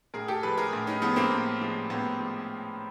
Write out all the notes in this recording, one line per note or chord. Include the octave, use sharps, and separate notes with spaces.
A2 G#4 A#4
G4 A4
F3 G#3 A4 B4
G#4 A#4
A2
C#4 D#4
F3 G#3 B3 C#4
A#3 C4
A2
F3 G#3
A2 B3 C#4
F3 G#3